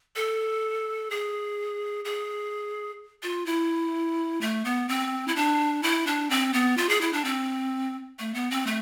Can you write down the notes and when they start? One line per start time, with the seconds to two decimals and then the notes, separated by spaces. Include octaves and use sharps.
0.16 A4
1.11 G#4
2.05 G#4
3.23 F4
3.46 E4
4.41 A3
4.65 B3
4.89 C4
5.28 E4
5.36 D4
5.83 E4
6.07 D4
6.30 C4
6.53 B3
6.77 F4
6.89 G#4
7.01 E4
7.13 D4
7.25 C4
8.19 A3
8.34 B3
8.51 C4
8.67 A3